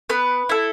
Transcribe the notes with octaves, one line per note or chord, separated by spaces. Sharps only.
B3 B4
E4 A4